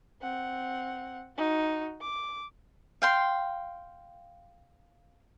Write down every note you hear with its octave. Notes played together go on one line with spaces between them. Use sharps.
C4 F#5
D#4 F#4
D6
F5 G5 C6